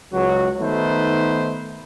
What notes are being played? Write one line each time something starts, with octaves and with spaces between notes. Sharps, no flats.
C#2 F#3 F#4
D#3 A3 B3 D#4 B4 C5